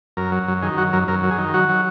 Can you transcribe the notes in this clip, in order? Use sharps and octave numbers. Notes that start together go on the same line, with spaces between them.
F#2 A#4
F#3
F#2
D#3 G#4
F#3 F#4
F#2 A#4
F#2 A#4
F#3
G#4
D#3
F#3 F#4
F#3